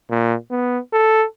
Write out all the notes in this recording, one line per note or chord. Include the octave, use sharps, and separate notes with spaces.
A#2
B3
A4